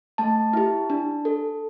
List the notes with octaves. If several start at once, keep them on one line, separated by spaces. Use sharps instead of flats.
A3 A5
E4 G4
D4
A4